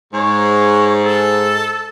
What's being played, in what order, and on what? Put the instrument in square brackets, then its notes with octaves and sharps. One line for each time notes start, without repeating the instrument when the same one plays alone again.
[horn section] G#2 [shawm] C#5
[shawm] A4